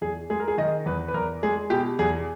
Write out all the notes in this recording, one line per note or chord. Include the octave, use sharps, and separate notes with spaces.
E2 G#4
G#3 G#4
A#4
G#4
D#3 D#5
E2 B4
B4
E2 A#4
G#3 G#4
B2 G4
E2 G#4